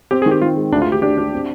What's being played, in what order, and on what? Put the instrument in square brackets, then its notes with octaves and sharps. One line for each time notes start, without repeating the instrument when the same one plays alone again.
[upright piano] C4 [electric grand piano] G4
[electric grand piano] G#4
[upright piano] D#3
[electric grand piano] G4
[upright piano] D#3 [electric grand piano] F4
[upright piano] G#3
[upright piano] D2 [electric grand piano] D4
[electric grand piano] F4
[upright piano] D2 [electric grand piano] G4
[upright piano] D4 [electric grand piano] G4
[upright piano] D4
C4